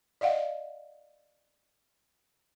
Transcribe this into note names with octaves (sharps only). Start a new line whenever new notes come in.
D5 D#5 F5 F#5